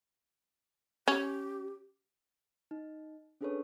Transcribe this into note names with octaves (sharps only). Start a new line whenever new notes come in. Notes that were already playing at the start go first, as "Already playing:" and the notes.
C#4 G4
D#4
C#4 D4 G#4 A4 B4 C#5